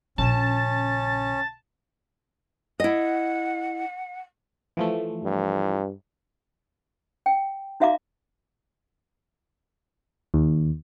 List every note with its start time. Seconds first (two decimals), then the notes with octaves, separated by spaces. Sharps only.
0.18 A#1 C#3 C#4 A5
2.80 E4 D#5 F#5
4.77 E3 F3 A3
5.23 G2
7.26 G5
7.80 D#4 F#4 E5 F5 A#5 D6
10.34 D#2